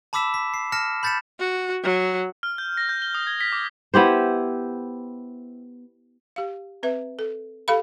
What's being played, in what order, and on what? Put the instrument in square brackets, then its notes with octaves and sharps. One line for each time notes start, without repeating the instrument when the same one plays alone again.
[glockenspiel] A5 B5 D6 E6 B6 E7
B6
C7
A5 F6 A#6 C#7 E7
B5 G6 A6 B6 C#7 E7
[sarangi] F#4
F#3
[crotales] F6
G6
A#6
G6
G7
D#6
G#6
B6
D6
[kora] B3 E4 G4 C5
[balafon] G4 F5
C4 B4 E5
A4
G4 A4 F5 B5